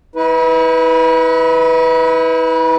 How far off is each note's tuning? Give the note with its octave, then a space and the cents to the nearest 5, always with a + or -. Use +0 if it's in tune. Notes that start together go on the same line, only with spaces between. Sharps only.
E4 -40 B4 +0